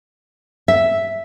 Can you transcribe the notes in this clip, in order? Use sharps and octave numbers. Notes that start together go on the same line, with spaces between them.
E5